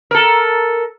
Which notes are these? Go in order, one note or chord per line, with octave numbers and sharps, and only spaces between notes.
A4 A#4